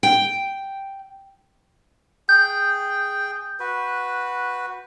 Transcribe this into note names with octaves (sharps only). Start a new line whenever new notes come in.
G5
G#4 G5 G6
F#4 B4